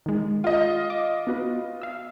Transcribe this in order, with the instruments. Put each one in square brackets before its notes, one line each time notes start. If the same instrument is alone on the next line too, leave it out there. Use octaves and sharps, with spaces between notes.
[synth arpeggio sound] D#3 G#3
[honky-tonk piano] F4 D#5
[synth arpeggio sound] D6
B3 F#4 B4
F5 E6